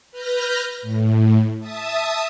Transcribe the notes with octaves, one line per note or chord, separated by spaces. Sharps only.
B4 F6 G6 A#6
A2
E5 A5 D#6